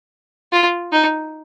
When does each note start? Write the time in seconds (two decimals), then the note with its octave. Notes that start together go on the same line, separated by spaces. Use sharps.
0.53 F4
0.92 D#4